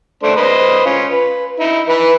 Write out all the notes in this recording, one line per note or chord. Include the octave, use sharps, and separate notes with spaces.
A3 D4 C5
B4 C5 D#5
C#4 F4
B4
D#4 E4
E3 B4